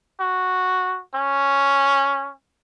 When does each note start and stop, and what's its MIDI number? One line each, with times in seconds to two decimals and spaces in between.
0.20 1.01 66
1.15 2.31 61